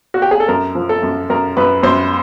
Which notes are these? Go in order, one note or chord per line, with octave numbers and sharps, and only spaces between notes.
F#4
G4
G#4
A4
F#2 A#4
F3
A4
F#2
F#2 A#4
F#2 B4
F#2 C5